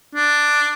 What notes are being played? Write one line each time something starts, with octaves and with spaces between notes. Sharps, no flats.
D4